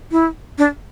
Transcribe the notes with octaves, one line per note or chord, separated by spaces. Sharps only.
E4
D4